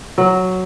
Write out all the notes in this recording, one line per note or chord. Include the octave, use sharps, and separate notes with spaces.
F#3